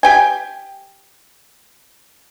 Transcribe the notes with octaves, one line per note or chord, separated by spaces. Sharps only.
G4 G5 G#5